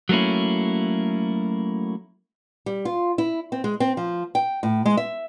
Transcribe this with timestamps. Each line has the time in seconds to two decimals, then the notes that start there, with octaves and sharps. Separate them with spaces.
0.09 F#3 A3 A#3 C#4 E4
2.66 G3
2.85 F4
3.18 E4
3.52 C4
3.64 G#3
3.80 C4
3.97 F3
4.35 G5
4.63 A2
4.85 G#3
4.97 E5